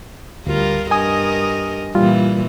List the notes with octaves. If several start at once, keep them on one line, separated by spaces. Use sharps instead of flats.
D2 G3 F4 A#4
G2 A#4 D#5 G#5 D#6
A#2 E3 G3 F4